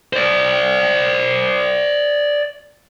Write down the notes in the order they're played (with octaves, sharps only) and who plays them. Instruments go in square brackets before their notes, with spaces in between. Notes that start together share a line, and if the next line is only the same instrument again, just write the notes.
[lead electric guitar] C5 D5